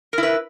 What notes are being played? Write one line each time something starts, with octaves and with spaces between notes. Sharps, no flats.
E4 A#4 B4